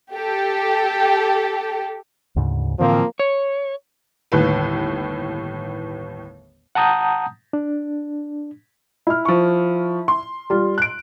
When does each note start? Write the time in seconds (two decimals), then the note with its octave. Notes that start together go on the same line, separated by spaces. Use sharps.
0.15 G4 A4
2.36 D2 G#2 C#3
2.79 A2 D3 E3 F3 A#3 C4
3.20 C#5
4.32 G1 D#2 A2 B4
6.75 F#5 A5 A#5 D#6 G6
7.53 D4
9.07 E4 F6
9.25 F3 C#6
10.08 C6
10.50 G3 F4
10.78 F#6 D7